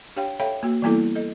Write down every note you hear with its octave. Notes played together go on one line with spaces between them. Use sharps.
D4 G4 C#5 F5 G5
A4 C#5 E5 F5 G5 B5
A#3 F#4
E3 G3 A#3 B3 E4 A4
A4 D#5